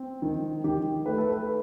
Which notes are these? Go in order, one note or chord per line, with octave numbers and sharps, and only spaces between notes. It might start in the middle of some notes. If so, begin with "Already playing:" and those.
Already playing: C4
D#3
D#3 G4
A3 B4
A4
B4